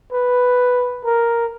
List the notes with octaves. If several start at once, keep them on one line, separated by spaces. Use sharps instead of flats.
B4
A#4